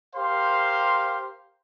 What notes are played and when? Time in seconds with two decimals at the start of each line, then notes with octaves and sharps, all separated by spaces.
0.16 G4 A#4 C5 F5 C6